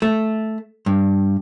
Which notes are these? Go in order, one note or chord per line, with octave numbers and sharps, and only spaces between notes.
A3
G2